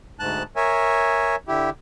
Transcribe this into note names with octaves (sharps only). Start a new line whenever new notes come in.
D2 G#2 A5 F#6
A#4 C#5 E5 G#5
D3 E4 G4